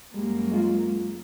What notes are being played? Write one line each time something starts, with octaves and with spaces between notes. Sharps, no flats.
F#2 G3 G#3 A#3
G#3 F4